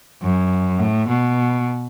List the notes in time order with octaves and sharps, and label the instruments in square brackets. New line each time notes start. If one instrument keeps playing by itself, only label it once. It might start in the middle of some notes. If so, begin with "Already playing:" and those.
[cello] F#2
A2
B2